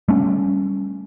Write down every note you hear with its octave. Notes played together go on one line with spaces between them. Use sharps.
G3 A3 C#4